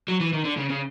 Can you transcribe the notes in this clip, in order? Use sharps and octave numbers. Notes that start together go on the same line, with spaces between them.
F#3
E3
D#3
D3
C#3
C#3